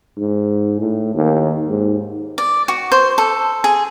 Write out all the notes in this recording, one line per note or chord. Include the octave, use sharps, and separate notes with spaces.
G#2
A2
D#2
G#2
D5
F#4
C5
A4
G#4